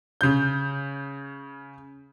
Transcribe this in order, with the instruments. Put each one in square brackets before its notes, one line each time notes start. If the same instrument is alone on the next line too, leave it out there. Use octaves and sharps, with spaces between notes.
[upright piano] C#3 G6